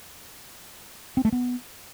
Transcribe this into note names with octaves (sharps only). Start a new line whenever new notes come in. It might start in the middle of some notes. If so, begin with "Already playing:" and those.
C4
A3
B3